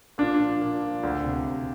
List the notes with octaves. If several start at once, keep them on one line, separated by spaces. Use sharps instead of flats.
A#2 D4
F3
A#2
F3
D2
C3
D2